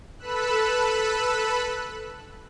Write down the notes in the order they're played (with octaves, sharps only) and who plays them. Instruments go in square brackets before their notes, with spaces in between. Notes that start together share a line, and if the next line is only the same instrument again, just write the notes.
[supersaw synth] A4 B4 B5 E6 F#6